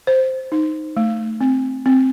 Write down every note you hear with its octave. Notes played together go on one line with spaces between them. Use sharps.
C5
D#4
A3
C4
C4